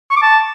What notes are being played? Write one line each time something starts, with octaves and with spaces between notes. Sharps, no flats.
C#6
D6
A5